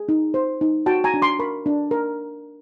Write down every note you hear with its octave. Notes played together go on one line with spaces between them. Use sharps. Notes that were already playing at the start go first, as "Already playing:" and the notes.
Already playing: G#4
D#4
C5
D#4
F#4 G5 A5
G#5 A#5
D4
C6 D6
A#4 B5 C#6
D4
A#4